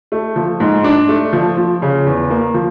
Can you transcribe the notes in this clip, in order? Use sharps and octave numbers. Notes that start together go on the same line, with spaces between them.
A3
F3
G#2
D4
A3
F3
F3
C#3
E2
A#3
F3